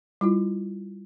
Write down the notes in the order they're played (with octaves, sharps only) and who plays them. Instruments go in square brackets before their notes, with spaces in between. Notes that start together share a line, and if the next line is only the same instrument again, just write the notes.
[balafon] G3 E4 F4